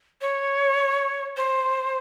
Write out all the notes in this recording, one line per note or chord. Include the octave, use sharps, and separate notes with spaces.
C#5
C5